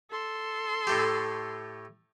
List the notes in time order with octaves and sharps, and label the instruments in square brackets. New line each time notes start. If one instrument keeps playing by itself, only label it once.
[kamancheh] A4 C6
[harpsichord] A2 A3 G4